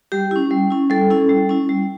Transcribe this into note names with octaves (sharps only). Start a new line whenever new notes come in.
G3 G4
C#4 E4
G3
C#4 E4
G3 A4
C#4 E4
G3
C#4 E4
G3